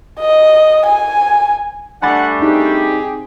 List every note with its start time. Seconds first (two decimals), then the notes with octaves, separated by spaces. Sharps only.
0.20 D#5
0.87 G#5
2.03 G3 A3 D4 F#5 G#5 B5 A6
2.42 C4 D#4 G4 G#4